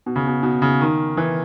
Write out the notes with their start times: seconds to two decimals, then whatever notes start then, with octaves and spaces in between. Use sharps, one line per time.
0.06 B2
0.16 C#3
0.27 B2
0.43 B2
0.62 C#3
0.81 D#3
1.17 E3